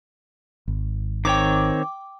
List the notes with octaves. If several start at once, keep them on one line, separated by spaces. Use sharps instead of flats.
G#1
D#3 C4 C#5 G5 D6